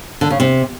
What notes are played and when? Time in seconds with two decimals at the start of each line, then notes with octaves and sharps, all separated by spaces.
0.21 D3
0.30 C#3
0.40 C3